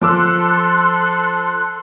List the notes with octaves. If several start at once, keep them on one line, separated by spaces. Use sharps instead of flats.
F3 A4 C6 D6 E6 F#6